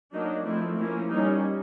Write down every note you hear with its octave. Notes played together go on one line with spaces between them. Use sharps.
F#3 A#3 D4 D#4
F3 A3 C4 E4
F3 A#3 C#4 E4
G3 A#3 C#4 D#4